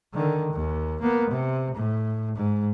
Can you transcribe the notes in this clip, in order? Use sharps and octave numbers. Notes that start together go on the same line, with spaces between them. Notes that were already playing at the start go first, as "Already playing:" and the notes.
D3 D#3
D#2
A#3 B3
C3
A2
G#2